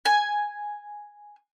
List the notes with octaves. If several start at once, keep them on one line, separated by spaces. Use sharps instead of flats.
G#5